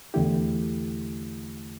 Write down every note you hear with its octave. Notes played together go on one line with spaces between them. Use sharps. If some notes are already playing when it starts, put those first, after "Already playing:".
E2 D3 A3 E4 G4